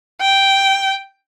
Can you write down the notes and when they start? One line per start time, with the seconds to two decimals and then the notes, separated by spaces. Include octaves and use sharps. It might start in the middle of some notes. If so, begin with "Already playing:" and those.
0.21 G5